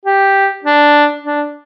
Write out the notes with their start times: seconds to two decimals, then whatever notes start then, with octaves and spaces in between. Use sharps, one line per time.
0.06 G4
0.64 D4
1.22 D4